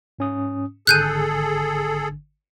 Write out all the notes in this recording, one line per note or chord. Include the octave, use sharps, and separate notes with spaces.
G#2 C#4 D#6
G#1 D3 G#4 A4 F#6 G6 D#7